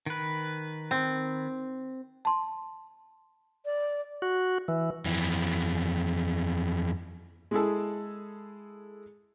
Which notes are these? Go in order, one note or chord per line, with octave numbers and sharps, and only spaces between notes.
D#3 B4
C4
A5 C6
D5
F#4
E3
F2 E3
G#3 E4 G#4 A4